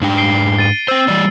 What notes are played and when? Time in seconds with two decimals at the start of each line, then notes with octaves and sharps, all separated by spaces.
0.01 G#2 D4 G5
0.18 C7 D7 G7
0.58 A6 D#7
0.88 C4 C5 E6
1.08 E3 G3 D5